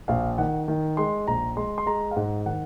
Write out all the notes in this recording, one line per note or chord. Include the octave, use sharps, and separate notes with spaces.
A#1 F5
D#3 F#5
D#3
G#3 C6
A#1 A#5
G#3 C6
C6
G#3 A#5
F5
G#2 F#5
D#3 F#5